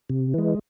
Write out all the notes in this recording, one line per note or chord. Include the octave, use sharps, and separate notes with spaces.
C3
E3 G#3